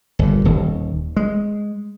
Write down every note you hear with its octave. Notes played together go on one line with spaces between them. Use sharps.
G1 A#2
D#1 D#2
G#3